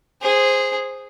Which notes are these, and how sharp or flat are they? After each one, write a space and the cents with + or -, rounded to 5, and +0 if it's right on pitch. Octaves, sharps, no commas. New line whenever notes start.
G#4 -10 C5 +0